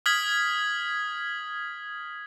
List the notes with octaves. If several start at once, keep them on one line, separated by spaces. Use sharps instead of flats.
D#6 F6 G#6 B6 F#7